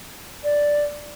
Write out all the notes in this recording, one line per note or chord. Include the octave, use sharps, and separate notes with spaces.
D5